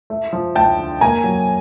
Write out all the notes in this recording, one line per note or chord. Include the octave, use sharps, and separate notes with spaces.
A3
F3
D2 G5 A5
D3
A#3 G#5 A#5
F#3